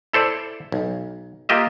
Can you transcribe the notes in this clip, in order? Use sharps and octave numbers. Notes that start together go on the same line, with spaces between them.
E4 A4 C5 D5
B1
A#3 F4 G4 D#5 E5